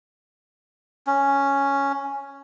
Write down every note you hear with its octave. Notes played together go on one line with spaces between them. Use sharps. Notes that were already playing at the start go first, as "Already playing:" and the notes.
C#4